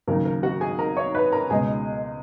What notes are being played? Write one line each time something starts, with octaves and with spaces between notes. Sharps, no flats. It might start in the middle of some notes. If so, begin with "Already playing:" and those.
D#2 C#3 F#3 A#3 A#4
A#4
F#4 F#5
G#4 G#5
A#4 A#5
C#5 C#6
B4 B5
A#4 A#5
C#2 B2 G#3 G#4 G#5